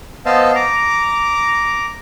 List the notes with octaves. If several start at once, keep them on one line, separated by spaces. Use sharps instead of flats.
B3 C5 D#5 F5 A5 E6
A#5 D6